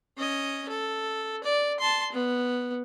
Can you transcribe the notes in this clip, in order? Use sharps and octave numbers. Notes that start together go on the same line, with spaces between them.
C#4 D#5
A4
D5
A5 C6
B3